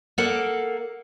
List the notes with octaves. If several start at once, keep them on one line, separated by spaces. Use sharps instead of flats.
A#3 A4 A#4 D5 F#5